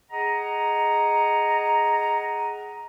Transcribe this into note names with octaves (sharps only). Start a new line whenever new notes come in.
G#4 D#5 F#5 A#5